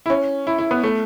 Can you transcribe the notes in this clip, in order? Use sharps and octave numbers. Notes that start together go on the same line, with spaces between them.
E4
C#4
E4
E4
B3
A3